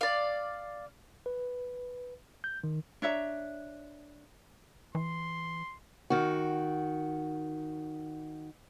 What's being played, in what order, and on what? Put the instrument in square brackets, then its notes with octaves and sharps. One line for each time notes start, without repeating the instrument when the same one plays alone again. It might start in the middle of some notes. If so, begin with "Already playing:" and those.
[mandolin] D5 F5
[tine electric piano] B4
G6
D#3
[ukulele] D4 C#5 E5 A#5
[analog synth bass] E3 [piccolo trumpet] C6
[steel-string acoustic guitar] D#3 F#4